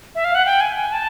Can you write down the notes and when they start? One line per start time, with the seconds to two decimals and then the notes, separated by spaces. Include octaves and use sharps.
0.15 E5
0.25 F5
0.35 F#5
0.46 G5
0.61 G#5
0.76 G#5
0.92 A5